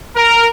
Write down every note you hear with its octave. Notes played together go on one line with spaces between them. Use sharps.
A#4